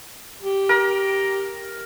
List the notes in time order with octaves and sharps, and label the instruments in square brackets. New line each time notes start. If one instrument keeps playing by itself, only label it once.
[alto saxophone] G4
[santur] A#4